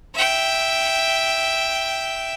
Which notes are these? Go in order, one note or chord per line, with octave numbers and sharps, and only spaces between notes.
E5 G5